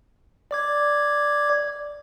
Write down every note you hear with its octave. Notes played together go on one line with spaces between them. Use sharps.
D5 D6 G#6